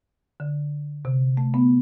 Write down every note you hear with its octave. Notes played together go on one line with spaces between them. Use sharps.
D3
C3
A3
B3